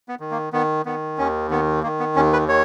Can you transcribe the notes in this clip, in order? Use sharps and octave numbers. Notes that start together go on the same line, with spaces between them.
B3
D#3
A#3
D#3 B3
D#3 B3
D#2 C#4
D#3 B3
D#3 A#3
B3
D#2 C#4
B4
D#3 C#5